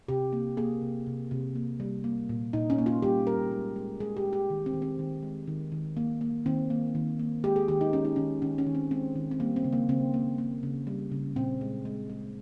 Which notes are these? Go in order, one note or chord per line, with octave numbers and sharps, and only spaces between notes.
C3 G4
A#3
A#3 G#4
C3
C3
C3
A#3
G3
A#3
A#2
A#2 D#4
C#4
A#3
F4
G3 G4
G3 A#4
G#3
G#3
G#3 G#4
G4
G#3
G4
D#3
C4
D#3
C4
D#3
G#3
D#3
D#3
A#3
A#3
D#3 C4
A#3
D#3
A#3
G#3 G4
G#4
D#3 G4
D#4
G#3 C#4
D#4
D#3 C#4
D#3 C#4
C#4
D#3
C4
G#3 C4
D#3
C4
G3 A#3
C4
C#3
A#3
C#3 C4
A#3
A#3
C#3
G3
C#3
A#2 C4
G#3
G#3
G#3